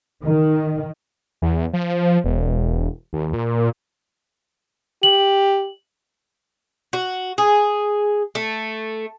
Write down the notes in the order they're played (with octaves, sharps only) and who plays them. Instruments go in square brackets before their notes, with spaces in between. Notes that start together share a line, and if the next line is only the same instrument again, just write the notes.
[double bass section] D#3
[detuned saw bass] E2
F3
E1
D#2
A#2
[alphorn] G4 [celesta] F#7
[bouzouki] F#4
G#4
A3